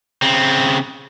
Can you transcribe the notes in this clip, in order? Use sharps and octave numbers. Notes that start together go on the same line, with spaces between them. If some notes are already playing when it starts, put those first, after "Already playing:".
C#3 C4